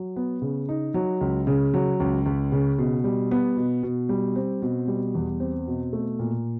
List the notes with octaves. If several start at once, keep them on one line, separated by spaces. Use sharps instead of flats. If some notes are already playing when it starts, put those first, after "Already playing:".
Already playing: F#3
B3
C#3
D#4
F#3
C#2
C#3
F#3
C#2
C#2
C#3
B2
G3
B3
B2
B2
G3
C4
B2
G3
E2
C4
B2
A3
A#2